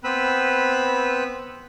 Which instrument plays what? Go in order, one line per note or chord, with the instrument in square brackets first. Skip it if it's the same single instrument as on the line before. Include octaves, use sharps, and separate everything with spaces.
[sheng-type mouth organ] B3 C4 B4 B5 E6